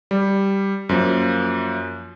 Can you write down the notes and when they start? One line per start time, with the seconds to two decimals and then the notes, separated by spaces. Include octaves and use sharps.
0.11 G3
0.89 F#2 F3 A#3